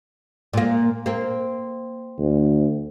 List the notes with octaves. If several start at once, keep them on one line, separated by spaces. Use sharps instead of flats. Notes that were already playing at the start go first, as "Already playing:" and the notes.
A#2 A#3
A#3 C4
D2